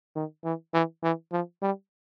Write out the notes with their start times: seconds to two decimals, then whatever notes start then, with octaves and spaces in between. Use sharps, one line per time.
0.16 D#3
0.44 E3
0.74 E3
1.03 E3
1.32 F3
1.62 G3